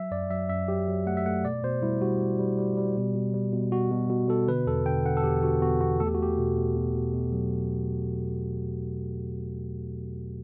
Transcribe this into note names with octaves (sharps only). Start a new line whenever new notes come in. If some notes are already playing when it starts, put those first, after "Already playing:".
Already playing: F#3 E5
F#2 D5
F#3 E5
F#2 E5
F#3 G4
F#3
A3 F#5
E5
A3 F#5
B2 D5
B2 C5
G3 E4
G3 F#4
G3
G3
G3
G3
B2
B2
G3
B2
B2 F#4
B2
B2
B2 A4
D3 B4
E2 A4
D3 G5
D3 F#5
A4
E2 G4
D3 F#4
E2 F#4
E2 F#4
A3 A4
G4
F#4
A3 G4
B2
B2
B2
B2
B2
F#3